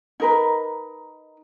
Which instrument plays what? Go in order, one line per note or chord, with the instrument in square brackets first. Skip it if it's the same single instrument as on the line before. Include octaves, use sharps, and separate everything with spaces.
[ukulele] D#4 A#4 B4